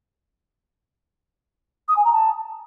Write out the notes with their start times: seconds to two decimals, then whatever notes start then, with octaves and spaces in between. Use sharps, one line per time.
1.88 D#6
1.97 G#5
2.05 A#5
2.13 A5